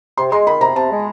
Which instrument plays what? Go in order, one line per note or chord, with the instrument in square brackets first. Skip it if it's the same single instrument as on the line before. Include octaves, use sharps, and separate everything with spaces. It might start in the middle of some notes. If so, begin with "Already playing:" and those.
[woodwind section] C3 [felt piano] C6
[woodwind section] G#3 [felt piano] C6
[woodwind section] D#3 [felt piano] B5
[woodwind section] C3 [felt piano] A#5
[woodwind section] C3 [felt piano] A5
[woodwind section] G#3